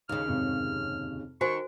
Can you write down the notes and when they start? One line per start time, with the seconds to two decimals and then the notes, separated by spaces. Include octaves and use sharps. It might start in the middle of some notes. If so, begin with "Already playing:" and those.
0.09 D#2 C#3 F6
0.28 F2 G#2 C3
1.41 D#3 F#4 C5 G#5 C#6